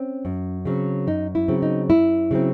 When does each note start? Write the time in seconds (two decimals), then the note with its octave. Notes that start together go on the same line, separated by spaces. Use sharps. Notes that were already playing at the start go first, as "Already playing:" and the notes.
Already playing: C4 C#4
0.25 F#2
0.65 C#3 F#3 C4
1.07 F#2 D#4
1.35 E4
1.48 C#3 F#3 C4
1.62 D#4
1.89 F#2 E4
2.31 C#3 F#3 C4